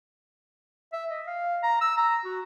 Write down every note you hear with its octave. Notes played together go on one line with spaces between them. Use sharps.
E5
D#5
F5
A#5
E6
A#5
F#4